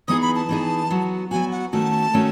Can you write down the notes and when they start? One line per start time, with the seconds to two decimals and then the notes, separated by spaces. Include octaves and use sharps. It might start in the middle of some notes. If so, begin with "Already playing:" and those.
0.08 E3 B3 D#4 G#4 D#6
0.21 B5
0.36 A5
0.49 E3 B3 D#4 G#4
0.90 F#3 B3 F#4
1.31 F#3 B3 F#4 G#5
1.52 F#5
1.72 D#3 A3 C#4 F#4 A5
2.14 D#3 A3 C#4 F#4